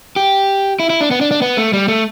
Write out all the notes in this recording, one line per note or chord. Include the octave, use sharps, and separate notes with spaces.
G4
E4
E4
D4
B3
D4
D4
B3
A3
G3
A3